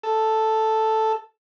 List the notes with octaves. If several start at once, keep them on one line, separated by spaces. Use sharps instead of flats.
A4